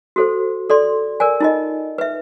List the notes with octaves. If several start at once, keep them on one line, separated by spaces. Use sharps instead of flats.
F#4 A4 C5
A4 D5 C6
A#4 D5 G#5
D#4 F4 D#5
B4 E5